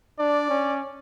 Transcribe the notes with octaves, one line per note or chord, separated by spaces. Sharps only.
D4 D5
C#4